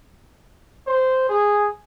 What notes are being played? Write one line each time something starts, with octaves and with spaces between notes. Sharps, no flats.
C5
G#4